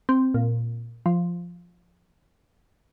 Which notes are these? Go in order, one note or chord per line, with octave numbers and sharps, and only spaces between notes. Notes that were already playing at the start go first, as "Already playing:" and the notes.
C4
A#2
F3